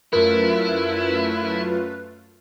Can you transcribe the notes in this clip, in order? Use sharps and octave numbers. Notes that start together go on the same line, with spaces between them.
F#2 A3 E4 F4 A#4 B4